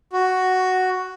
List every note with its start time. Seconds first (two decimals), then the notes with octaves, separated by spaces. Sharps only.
0.13 F#4